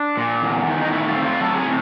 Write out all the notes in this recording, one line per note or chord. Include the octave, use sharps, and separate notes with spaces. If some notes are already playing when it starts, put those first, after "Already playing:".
Already playing: D4
A#2
E2
D#3
D#4
A3 E4
F4
C4
F4
F#3 A4
G#4
A2